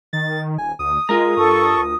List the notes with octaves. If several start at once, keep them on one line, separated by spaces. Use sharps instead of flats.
D#3 A6
D#1 G#5
D2 D#6
G#3 F4 A#4 A#5
G2 A4 C#6
D2